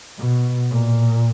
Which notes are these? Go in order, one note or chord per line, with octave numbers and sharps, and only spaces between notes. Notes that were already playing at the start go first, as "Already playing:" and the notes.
B2
A#2